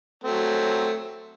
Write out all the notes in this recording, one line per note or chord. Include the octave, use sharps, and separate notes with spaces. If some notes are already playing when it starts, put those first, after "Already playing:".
F#3 A3 C4